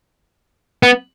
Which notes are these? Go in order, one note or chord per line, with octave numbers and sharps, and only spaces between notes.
B3